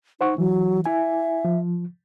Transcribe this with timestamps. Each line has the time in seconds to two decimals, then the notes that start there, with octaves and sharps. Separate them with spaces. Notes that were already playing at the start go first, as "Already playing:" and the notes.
0.21 D#4 C5 F#5 C#6
0.38 E3 F#3
0.86 E4 E5 G#5
1.45 F3